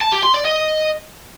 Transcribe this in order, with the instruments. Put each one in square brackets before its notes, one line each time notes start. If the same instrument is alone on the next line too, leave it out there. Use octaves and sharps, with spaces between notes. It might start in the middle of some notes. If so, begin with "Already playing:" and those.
[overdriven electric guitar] A5
G4
C6
D5
D#5